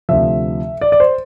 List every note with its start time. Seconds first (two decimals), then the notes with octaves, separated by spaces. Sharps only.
0.09 D2 C3 F3 E5
0.81 D5
0.92 D5
1.00 C5